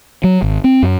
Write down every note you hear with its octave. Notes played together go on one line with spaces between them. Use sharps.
F#3
G#1
C4
F#2